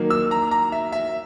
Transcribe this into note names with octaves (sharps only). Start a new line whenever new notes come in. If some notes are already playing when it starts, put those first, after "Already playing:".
Already playing: D#3 F#3 A#3
E6
A#5
A#5
E5
E5